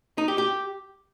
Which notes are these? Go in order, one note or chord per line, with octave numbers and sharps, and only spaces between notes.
D#4
G4
G4